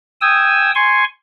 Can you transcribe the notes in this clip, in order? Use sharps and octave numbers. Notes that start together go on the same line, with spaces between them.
G5 G#5 D#6 E6
G#5 C6 C#6